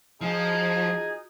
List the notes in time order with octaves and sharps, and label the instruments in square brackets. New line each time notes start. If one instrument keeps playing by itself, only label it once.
[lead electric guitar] F3 [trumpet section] D#4 G#4 [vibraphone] F4 F#4